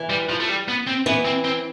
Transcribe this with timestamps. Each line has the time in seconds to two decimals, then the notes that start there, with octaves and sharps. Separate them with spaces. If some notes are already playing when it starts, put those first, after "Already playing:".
Already playing: E3
0.10 G3
0.29 F3
0.40 A3
0.49 G3
0.68 B3
0.87 C4
1.06 E3 B3
1.25 C4
1.44 C4